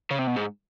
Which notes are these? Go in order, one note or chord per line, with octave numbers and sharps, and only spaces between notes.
C#3
C3
B2
G#2